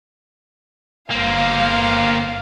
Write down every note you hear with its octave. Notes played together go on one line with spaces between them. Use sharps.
G1 A#3 C4 F5